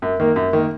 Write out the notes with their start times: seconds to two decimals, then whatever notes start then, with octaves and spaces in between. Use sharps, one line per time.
0.02 F#2
0.20 D#3 A#3
0.36 F#2
0.53 D#3 A#3